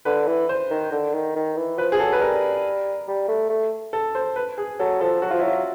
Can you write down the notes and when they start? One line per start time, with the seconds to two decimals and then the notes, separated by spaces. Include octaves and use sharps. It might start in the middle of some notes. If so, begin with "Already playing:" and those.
0.05 D3 B4
0.27 E3
0.49 C5
0.71 D#3
0.92 D3
1.13 D#3
1.36 D#3
1.57 E3
1.78 F3 B4
1.92 G#4
1.99 F#3 A4
2.12 B4
2.21 G3 A#4
3.08 G3
3.28 A3
3.50 A3
3.93 A4
4.15 C5
4.36 B4
4.58 G#4
4.79 F#3 A4
5.01 F3 A4
5.22 F#3 F#4
5.31 F3 F4
5.39 F#3 E4
5.48 F4